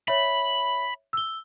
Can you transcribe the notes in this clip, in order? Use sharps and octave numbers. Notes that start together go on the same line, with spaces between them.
C#5 E5 B5
E6 G7